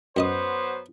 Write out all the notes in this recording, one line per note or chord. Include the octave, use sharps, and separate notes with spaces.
F#2 F#3 B3 C5 D#5 D#6